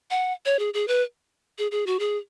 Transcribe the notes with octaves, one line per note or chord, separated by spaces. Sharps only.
F#5
C#5
G#4
G#4
B4
G#4
G#4
F#4
G#4